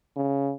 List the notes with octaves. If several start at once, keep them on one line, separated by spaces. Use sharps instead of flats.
C#3